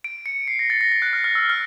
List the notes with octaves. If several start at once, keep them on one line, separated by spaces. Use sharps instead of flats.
D7
C#7
C7
A#6
A6
A#6
A6
F#6
F6
F6
E6
F6